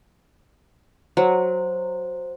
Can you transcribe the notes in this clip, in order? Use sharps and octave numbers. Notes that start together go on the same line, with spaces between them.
F#3 C5